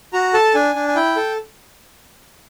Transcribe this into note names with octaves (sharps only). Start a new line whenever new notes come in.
F#4 A#5
A4 A5
D4 G#5
D4
G#5
E4 G5
A4